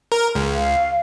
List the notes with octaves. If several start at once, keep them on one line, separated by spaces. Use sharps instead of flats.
A#4
C#2
F5